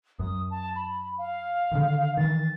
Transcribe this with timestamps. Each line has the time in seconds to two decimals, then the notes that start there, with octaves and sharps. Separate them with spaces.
0.19 F#2 D#6
0.51 A5
0.76 B5
1.18 F5
1.71 D3 D#3
2.17 D#3 E3 A6